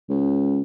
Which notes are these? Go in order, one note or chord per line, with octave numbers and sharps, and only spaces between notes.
C#2